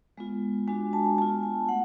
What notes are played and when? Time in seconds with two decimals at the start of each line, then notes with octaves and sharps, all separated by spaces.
0.18 G#3 B3 F4
0.68 G#3 D4 F#4 G#5
0.93 A5
1.18 B3 A5
1.22 F4
1.43 G#5
1.69 A3 F#5